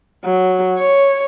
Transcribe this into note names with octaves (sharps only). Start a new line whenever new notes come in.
F#3
C#5